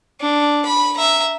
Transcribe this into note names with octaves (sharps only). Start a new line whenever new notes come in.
D4
B5
E5 A#5